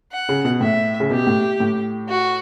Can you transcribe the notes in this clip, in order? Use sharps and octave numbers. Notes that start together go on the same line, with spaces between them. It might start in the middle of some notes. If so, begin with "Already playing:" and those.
F#5
C#3
B2
A2 E5
C#3
B2 G4
A2
A2
F#4